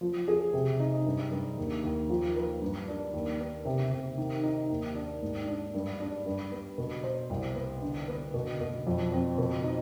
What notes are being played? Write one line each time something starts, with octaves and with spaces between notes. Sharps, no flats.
F3
G#4
C3
D#4
G2
G2
D#2
D#2
F3
B4
G2
D4
D#2
B3
C3
C3
D#3
D#4
D#2
D4
G#2
D4
G2
D4
G2
B3
B2
C5
C2
B3
D3
B3
B2
B2
F2
C4
B2
D#4